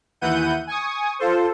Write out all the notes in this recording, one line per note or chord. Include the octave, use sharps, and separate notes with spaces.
D#2 E3 E4 F#5 G6 D#7
G#5 C#6 D#6
F4 A4 C5